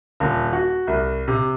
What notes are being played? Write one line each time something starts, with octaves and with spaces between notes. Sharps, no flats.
D#1
F#4
C2
C3